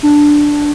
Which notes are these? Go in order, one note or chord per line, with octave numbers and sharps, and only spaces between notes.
D4